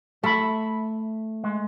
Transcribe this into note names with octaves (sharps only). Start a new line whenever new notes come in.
A3 E5 B5
G#3